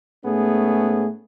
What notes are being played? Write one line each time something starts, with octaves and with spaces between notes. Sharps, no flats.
G#2 A3 B3 C#4 G#4